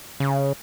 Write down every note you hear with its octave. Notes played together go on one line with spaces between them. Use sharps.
C#3